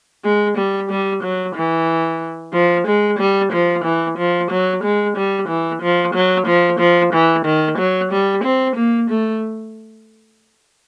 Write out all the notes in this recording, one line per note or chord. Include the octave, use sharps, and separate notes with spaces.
G#3
G3
G3
F#3
E3
F3
G#3
G3
F3
E3
F3
F#3
G#3
G3
E3
F3
F#3
F3
F3
E3
D#3
F#3
G3
C4
A#3
A3